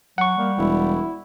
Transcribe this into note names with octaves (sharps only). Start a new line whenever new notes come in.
F#3 F#5 C#6
G3 A#3
E1 E4